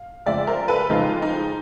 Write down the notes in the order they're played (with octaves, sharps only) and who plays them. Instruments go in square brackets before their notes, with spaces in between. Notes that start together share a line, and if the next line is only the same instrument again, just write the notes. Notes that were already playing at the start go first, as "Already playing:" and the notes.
Already playing: [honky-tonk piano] F5
F2 C#3 F3 G#3 D5 E5
A#4 C5
A4 B4
F2 C#3 F3 G#3 D#4 F4
D#4